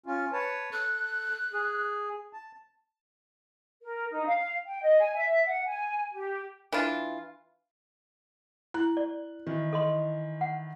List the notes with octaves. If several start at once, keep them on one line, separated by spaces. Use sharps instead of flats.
C#4 F4
B4 C#5 A5
A4 F#6
G#4
A5
A#4
D#4
F5
G5
D#5
G#5
E5
F#5
G#5
G4
E3 D4 F4
E4 F#6
D5
D#3 E3
A4 D#5 C6
F#5